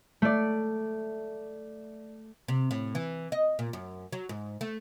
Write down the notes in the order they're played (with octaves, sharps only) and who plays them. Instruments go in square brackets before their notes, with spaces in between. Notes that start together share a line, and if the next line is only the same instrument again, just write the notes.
[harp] A3 D5
[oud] C3
A2
E3
D#5
A#2
F#2
F#3
G#2
A3